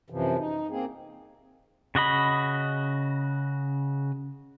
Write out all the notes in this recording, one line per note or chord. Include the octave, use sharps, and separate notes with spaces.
F#2 C3 E3 F3
D#4
A#3 C4 G#4
C#3 F#4 D#5 B5